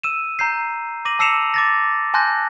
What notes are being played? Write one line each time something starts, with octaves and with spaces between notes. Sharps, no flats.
E6 D#7 E7
A#5 G6 C7
D6 A#6 D#7 F#7
A5 E6 C7 C#7 E7 F7
D6 A6 A#6
G#5 A5 C6 F#6 G6 A#6